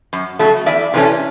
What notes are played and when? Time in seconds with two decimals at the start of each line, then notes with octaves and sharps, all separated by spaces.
0.13 F#2
0.39 C#3 F#3 A3
0.66 E2 D5 E5
0.94 C3 E3 A3 C#4